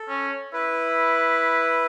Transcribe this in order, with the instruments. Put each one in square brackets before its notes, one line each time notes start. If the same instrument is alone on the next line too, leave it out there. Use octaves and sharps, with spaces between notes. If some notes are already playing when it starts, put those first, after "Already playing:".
Already playing: [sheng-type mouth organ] A4
[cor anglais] C#4
[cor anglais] E4 [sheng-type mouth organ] B4